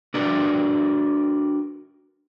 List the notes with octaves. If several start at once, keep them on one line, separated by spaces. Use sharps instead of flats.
D4 F#4 G4 A#4 B4 D5